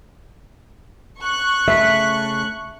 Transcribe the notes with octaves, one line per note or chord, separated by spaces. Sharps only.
C#6 F#6
C#3 A3 E5 B5